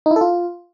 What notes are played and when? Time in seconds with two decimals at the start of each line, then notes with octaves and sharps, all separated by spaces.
0.06 D#4
0.11 E4
0.16 A4
0.21 F4